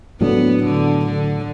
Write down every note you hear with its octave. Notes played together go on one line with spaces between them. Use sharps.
A2 F#3 A3 B3 D4
D3
D3